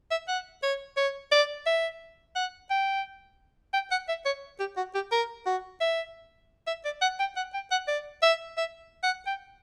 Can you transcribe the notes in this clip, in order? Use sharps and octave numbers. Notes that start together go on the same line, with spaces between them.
E5
F#5
C#5
C#5
D5
E5
F#5
G5
G5
F#5
E5
C#5
G4
F#4
G4
A#4
F#4
E5
E5
D5
F#5
G5
F#5
G5
F#5
D5
E5
E5
F#5
G5